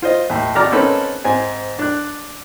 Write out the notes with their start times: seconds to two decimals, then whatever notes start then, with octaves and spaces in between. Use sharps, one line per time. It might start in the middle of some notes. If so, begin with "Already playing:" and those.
0.02 F4 C5 D#5
0.29 D#2 A2
0.55 G#1 D5 A#5 D6 F6
0.72 A#3 C4 C#4 D#4 A4 B4
1.24 G#2 C4 G#5
1.79 D4 F#6